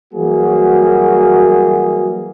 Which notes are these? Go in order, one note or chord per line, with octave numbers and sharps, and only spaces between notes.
E3 F#3 G3 A#3 F#4 G#4